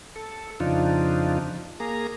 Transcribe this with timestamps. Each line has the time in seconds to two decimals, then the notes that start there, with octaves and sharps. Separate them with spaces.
0.16 A4
0.60 F2 C#3 F3 D4 D#4 F4
1.80 A#3 G#4 A#5